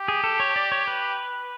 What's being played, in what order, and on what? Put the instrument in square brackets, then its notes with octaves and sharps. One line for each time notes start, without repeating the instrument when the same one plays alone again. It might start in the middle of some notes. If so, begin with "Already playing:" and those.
Already playing: [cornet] G4
[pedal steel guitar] G#4
A4
C#5
D5
C#5
B4